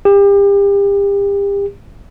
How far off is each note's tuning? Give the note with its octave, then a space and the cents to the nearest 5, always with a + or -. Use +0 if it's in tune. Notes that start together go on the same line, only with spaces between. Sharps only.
G4 +35